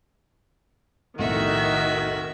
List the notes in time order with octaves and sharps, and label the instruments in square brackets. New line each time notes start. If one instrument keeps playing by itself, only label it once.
[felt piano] B1 F2 A2 [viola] D#3 [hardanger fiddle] F#4 E5